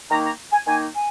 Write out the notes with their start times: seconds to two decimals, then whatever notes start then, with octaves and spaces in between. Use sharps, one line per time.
0.10 D#3 A#3 D#4 A#5
0.25 A#5
0.52 G#5
0.67 D#3 A#3 D#4 G#5
0.95 G#5